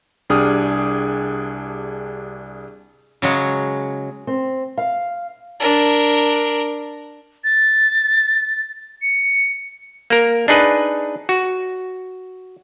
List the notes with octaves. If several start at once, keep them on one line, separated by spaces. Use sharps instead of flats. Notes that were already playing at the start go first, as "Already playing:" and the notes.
C2 D4 G4 G#4 D#6 F6
C#3 F#3 G#3
C4
F5
D4 A#4
A6
C#7
A#3 A#4
D4 D#4 G#4 B4
F#4